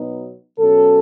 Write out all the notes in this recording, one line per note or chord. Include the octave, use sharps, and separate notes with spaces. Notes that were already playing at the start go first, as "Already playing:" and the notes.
Already playing: B2 F#3 B3 D#4
B2 F#3 C#4 A4